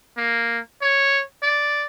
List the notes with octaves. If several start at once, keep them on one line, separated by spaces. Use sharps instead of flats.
A#3
C#5
D5